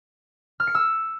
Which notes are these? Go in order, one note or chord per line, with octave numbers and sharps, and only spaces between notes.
F6
C#7
E6